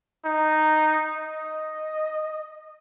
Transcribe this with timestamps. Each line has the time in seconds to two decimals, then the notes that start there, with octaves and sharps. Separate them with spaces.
0.25 D#4
1.15 D#5